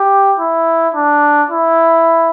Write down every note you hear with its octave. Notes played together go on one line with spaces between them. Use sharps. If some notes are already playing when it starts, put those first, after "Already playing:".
Already playing: G4
E4
D4
E4